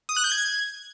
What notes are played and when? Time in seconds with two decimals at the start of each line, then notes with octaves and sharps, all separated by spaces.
0.09 D#6
0.16 F#6
0.24 G6
0.32 G#6